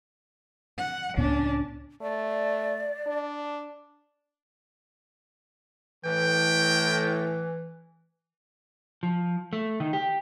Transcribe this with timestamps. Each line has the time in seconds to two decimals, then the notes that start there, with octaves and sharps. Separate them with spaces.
0.78 F#5
1.17 C#2 A2 B3 C#4 D4
2.02 A3 D5
3.07 D4
6.05 A2 E3 G5
9.03 F3
9.53 A3
9.80 D#3
9.93 G4